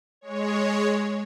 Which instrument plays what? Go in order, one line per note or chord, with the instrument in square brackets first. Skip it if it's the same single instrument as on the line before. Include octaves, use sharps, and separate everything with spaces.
[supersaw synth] G#3 C#5